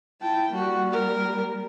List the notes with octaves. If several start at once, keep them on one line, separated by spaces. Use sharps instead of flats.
E4 G5 A5
G3 A#3 F#4
A#4